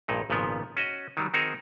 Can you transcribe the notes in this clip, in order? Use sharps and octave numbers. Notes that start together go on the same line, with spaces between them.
A#1 G2 A#2 D#4
G#1 A#2 C#3 F3 B3
C#4 F#4 D#5
D#3 F#3 G3
D#3 C4 D#4 F#4 G#4 A#4